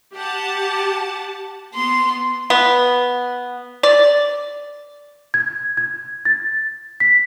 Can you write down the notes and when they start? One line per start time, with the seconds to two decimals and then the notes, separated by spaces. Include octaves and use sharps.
0.15 G4 F#5 A5
1.75 B3 C6
2.50 B3
3.83 D5
5.34 G#6
5.77 G#6
6.25 A6
7.00 B6